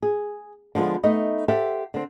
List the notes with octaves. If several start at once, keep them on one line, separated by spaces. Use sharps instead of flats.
G#4
D3 F3 G#3 B3
A3 B3 D#4 D#5
G4 A4 C5 E5 F#5
D3 C4